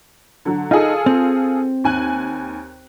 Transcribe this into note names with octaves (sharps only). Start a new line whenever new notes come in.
D3 F#3
D#4 F4 G#4 A4
C4
D#2 G#5 F#6